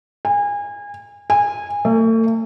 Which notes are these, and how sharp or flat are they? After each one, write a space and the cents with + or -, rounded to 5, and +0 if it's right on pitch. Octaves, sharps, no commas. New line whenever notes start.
G#5 -30
G#5 -20
A3 +40